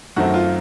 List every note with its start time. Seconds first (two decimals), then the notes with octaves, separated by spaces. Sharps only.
0.16 F#2 D#3 A3 C4 F#4
0.34 F4